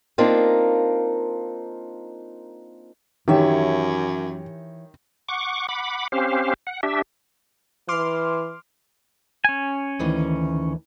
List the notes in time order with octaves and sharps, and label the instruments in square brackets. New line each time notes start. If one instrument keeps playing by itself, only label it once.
[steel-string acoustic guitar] A#3 C4 D4 D#4 F4 A#4
[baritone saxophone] F#2 [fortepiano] D#3 [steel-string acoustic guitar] E3 C#5 E5 [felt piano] G4
[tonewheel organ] F#5 C#6 D6
F#5 B5 D6
C4 C#4 G4 C5 F5
F#5
D4 G4 E5
[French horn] E3 [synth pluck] C6 D6 F6
[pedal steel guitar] C#4 G#5
[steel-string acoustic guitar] D2 D#3 E3